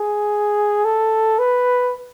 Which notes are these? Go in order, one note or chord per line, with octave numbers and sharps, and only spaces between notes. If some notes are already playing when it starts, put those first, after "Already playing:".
Already playing: G#4
A4
B4